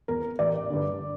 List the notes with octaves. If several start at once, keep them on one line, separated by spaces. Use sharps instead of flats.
E2 E3 A#4
A1 D5
G2 D3